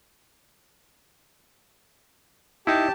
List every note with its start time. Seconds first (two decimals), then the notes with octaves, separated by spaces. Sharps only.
2.67 D#4 E4 G4 A5